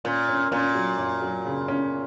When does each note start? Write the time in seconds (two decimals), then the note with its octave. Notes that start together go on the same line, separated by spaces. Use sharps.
0.05 A#2 C#4
0.29 C#4
0.52 A#2 C#4
0.75 F#3
0.98 F#2
1.21 F#3
1.45 C#3
1.68 C#4